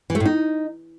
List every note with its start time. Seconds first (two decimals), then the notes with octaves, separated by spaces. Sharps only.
0.10 E3
0.15 A3
0.20 A2
0.26 D#4